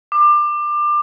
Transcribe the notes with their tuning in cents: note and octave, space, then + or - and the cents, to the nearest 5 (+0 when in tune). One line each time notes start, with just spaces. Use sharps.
D6 +25